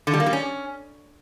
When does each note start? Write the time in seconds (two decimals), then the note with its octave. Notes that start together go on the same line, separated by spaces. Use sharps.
0.07 D3
0.13 G3
0.20 A#3
0.26 G3
0.33 C#4